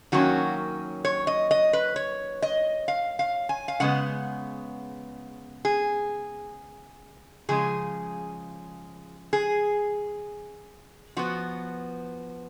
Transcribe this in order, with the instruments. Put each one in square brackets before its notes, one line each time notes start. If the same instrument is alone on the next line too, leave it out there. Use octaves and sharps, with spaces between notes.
[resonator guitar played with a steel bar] D#3 F#3 A#3 C#4 F#4
C#5
D#5
D#5
B4
C#5
D#5
F5
F5
G#5
F5
C#3 G#3 B3 F#5
G#4
C#3 F3 G#3 G#4
G#4
F3 B3 F#4